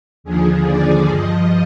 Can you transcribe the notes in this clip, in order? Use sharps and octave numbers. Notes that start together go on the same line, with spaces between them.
D#2 D3 F3 G#4
D5
G2 F3 D#5